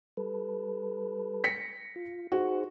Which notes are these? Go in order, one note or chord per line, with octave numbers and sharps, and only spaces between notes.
G3 A4 B4
A#6 B6 C#7
F4
D#4 F#4 G#4 C5